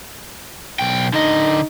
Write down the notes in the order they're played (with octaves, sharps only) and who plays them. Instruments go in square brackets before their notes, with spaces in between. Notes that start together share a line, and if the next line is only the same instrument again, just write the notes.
[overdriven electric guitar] B1 G5
[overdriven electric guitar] D3 D#5 [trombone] D#4